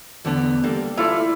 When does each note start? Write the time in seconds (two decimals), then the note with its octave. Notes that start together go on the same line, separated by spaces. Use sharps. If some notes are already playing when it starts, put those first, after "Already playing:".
0.25 E2 D3 B3
0.64 G3 A#3 A4
0.97 E4 F4 A4 D5